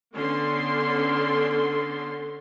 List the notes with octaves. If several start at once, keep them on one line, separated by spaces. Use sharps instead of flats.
D3 B3 C#4 A4 C6